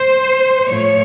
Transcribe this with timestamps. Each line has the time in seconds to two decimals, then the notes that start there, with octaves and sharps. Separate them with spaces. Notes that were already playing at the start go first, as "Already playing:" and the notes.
Already playing: C5
0.69 A2 F3 A3 C#5